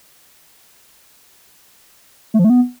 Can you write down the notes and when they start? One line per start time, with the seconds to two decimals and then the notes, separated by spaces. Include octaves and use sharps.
2.34 A3
2.39 F3
2.44 A3
2.50 B3